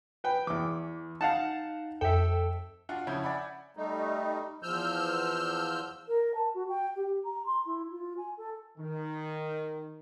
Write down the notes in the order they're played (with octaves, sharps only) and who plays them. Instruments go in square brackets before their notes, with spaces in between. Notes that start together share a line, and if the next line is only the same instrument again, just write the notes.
[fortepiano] B4 G5
[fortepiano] E2 D6 [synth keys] E3
[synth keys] D#4 [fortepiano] F5 F#5 A5
[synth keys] F2 A4 [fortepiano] E5 G5
[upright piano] D4 F4 F#4 F#5
C#3 F3 C#4 E4 G6 G#6
D5 E5 F#5 G#5 B5
[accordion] G3 A3 D#4
E2 F3 E6 F6 G6
[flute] A#4
A5
F#4
G5
G4
A#5
C6
E4
F4
G#5
A4
[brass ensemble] D#3